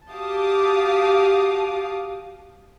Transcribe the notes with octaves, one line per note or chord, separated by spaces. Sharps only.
F#4 G4 F5 A5 D6 D#6